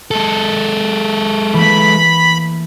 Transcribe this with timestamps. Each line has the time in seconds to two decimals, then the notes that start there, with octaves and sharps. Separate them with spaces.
0.11 G#3 A4
1.53 E3 A3 A#3 B5